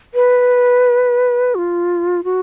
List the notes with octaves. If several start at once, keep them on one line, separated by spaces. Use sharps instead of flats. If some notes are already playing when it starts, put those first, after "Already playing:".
B4
F#4
F4
F#4